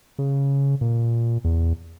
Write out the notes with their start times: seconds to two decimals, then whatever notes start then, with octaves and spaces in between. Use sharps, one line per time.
0.19 C#3
0.81 A#2
1.45 E2